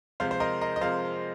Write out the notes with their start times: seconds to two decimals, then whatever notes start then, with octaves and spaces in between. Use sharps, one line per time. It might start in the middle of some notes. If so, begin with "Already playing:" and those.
0.20 C3 F3 G#3 C5 F5
0.31 C5
0.40 A#4 D#5
0.61 A#4 D#5
0.76 D#5
0.81 C3 F3 G#3 C5 F5